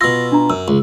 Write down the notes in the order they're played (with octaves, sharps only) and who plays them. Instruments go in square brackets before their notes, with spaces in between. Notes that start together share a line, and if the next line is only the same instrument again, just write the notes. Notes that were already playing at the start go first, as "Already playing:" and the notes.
[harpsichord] B2 F4 [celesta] E6 A#6
[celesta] D4 A#5
[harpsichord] F#2 [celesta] E6
[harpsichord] C#2